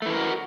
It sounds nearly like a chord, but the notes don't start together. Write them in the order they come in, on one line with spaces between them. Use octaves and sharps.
A3 E3 A4 A#4 F#4